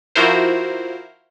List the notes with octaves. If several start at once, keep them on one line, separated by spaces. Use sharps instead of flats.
F3 E4 F#4 A#4 C5